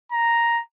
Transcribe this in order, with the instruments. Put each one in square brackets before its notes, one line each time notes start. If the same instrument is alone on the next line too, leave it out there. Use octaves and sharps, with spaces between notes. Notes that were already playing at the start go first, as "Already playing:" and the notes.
[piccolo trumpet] A#5